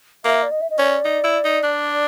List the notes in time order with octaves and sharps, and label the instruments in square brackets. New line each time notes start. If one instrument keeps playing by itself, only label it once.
[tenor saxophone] A#3 [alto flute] E5
[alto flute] D5
D#5
E5
D#5
[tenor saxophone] C#4 [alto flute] D5
[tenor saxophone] D#4
E4
D#4
D4